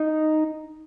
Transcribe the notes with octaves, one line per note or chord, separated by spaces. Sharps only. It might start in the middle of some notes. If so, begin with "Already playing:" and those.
Already playing: D#4